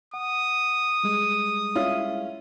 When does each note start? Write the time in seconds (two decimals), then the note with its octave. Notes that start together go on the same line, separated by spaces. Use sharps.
0.14 F#5 D#6
1.04 G3 G#3
1.75 C#4 E4 F4